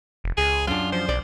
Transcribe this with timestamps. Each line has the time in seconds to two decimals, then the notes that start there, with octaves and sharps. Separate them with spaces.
0.24 F1
0.37 C#2 G#4
0.67 F#2 D4 F4
0.93 F3 C5
1.09 B1 D5